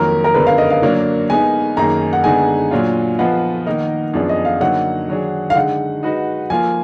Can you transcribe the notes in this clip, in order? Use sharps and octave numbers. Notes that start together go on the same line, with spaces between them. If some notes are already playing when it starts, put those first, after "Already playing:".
Already playing: F2 D#3 F#3 A#3 F4 A#4
A#4
F#2 D3 G#3 B3 D4 B4
F5
D#5
F5
D3 F#3 A#3 D4
G#3 B3 D#4 G#5
F#2 D#3 A#3 D#4 G#4 A#5
F#5
D3 G#3 B3 D#4 G#4 G#5
A#2 F#3 D4 F4
F3 B3 F4 B4 D#5 F#5
D#3 A#3 D#4 A#4 D#5
F#2 F3 B3 D4 G#4
D#5
F5
D3 F#3 A#3 D#4 F#5
D#3 F#3 D4 G#4
F5
D3 G#3 D#4 F#5
G#3 D#4 F#4 B4 D#5
F3 A#3 F4 G#5